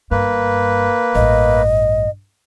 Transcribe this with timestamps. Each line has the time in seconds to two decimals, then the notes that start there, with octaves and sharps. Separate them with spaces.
0.11 G1 G2 A#3 B4
1.15 A1 G2 D#5